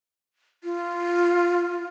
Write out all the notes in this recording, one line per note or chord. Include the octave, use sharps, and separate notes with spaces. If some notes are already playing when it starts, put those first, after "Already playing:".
F4